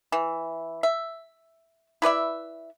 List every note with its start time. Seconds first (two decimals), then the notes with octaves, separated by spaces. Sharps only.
0.12 E3
0.83 E5
2.02 E4 B4 D5 E5